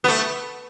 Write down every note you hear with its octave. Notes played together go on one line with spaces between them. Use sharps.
B3
A3